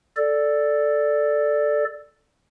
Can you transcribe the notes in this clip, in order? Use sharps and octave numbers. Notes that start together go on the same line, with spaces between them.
A4 D5